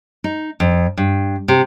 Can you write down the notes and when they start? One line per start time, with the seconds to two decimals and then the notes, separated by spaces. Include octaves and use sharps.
0.24 D#4
0.60 F2
0.97 G2
1.48 C3